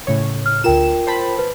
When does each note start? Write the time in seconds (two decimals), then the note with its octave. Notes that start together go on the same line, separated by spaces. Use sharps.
0.07 A2 C#3 C#5
0.46 F6
0.64 D2 F4 A#4 G5 E7
1.07 C5 A5 B5
1.39 B4